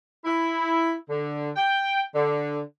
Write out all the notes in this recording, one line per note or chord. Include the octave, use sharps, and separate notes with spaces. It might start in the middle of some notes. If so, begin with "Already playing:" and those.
E4
D3
G5
D3